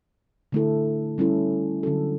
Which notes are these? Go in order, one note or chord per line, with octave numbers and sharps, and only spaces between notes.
D3 A3 E4 A4
G3 C#4 E4 A4
D3 F#3 C#4 F#4 A4